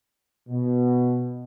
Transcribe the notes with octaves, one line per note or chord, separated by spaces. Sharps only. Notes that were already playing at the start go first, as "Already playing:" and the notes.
B2